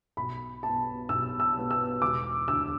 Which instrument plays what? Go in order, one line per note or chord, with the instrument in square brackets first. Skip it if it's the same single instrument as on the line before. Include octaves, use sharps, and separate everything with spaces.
[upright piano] B1 B5
B2 B3 A5
B1 E6
E6
B2 B3
E6
E1 D6
D2 D3 E6